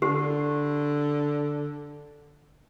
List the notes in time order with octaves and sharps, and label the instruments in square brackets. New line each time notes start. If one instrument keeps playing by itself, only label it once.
[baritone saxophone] D3 [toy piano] G4